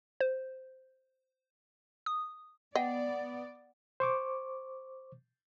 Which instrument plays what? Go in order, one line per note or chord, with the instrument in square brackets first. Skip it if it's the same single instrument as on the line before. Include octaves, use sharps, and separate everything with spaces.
[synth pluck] C5
D#6
[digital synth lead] B3 [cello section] D5 [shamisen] D#5 G5 [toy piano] F#5
[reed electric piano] C5 C#6 D6